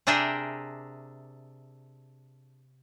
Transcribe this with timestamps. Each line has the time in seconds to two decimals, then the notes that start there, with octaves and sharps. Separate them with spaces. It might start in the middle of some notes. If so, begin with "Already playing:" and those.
0.07 C3 D4 G#4 A#4 E5 G5